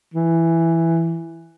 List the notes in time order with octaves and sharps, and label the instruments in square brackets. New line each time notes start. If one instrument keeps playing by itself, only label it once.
[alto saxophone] E3